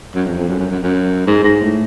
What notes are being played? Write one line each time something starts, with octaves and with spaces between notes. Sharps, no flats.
F#2
F2
F2
F#2
F#2
F#2
F#2
G#2
G#2
A2